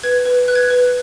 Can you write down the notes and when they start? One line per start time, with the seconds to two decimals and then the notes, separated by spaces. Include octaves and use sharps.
0.03 B4 G#6
0.25 B4
0.48 B4 F#6
0.55 G#6
0.63 F#6
0.70 B4